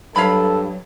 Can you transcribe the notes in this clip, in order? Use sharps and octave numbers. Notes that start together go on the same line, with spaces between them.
G2 F#3 A4 F5 B5